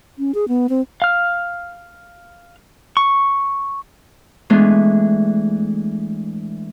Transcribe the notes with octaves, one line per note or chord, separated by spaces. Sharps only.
C#4
G#4
B3
C4
F5 F6
C#6
E3 G#3 A3 B3 D4